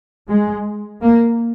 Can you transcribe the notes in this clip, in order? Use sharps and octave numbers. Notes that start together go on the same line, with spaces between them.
G#3
A#3